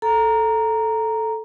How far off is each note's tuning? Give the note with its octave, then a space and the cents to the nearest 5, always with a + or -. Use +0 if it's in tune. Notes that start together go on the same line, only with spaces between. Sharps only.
A4 -5 A#5 +0